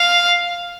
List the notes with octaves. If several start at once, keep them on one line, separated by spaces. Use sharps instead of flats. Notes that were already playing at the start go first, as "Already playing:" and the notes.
Already playing: F5